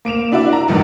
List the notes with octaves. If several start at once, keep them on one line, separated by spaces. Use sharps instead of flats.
A#3 D7 E7 F7
D4 E4 F#4 D5 E5
A#5
F1 E2 G2 D#3 E3